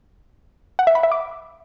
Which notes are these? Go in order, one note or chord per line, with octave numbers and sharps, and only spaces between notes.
F#5
E5
B5
E5
D6